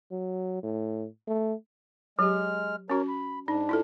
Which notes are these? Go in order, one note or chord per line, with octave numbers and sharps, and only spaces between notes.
F#3
A2
A3
F#3 G#3 G4 F6
C#4 F#4 A#4 C#5
B5
G#2 D4 D#4
E4 F4 A4